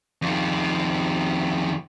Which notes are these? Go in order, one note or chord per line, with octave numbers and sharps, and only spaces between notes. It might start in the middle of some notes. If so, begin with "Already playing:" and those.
F2 D#3